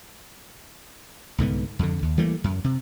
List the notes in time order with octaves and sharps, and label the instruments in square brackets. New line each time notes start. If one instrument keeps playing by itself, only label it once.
[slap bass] C2 G#2 D3 B3
F2 D3
D#2
E3 G3 A3 A#3
F#2
C3